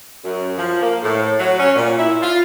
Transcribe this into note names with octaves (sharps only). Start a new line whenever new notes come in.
F#2
F3
A#3
A2
F#3
C#4
A#2
E4
F4